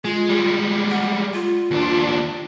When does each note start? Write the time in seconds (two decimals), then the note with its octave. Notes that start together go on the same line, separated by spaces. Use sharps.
0.05 G#3 F4
0.29 G3 G#3
0.91 F#5
1.34 F4
1.71 D#2 D4